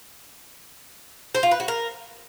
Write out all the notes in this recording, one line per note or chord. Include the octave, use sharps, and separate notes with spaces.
C5
F4
B4
F#4
A#4